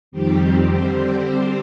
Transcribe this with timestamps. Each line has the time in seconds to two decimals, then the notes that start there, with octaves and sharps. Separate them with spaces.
0.11 F2 D#3 G3 C4 G4
0.70 D3 G3 C4 G4 C5